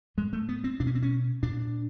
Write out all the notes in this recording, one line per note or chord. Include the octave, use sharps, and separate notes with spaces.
A2 G#3
A3
B3
C4
B2 D4
C#4
C4
C#4
A#2 D4